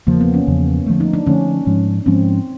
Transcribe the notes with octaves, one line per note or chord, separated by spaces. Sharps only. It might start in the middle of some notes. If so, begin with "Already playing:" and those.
E2 C#3 F3 A#3
B3
C#4
E2 C#3 F3
D3 F3 A3
D#4
D4
D3 F3 A3 C#4
G#2 F3 G#3 C#4
G#2 F3 G#3 C4 C#4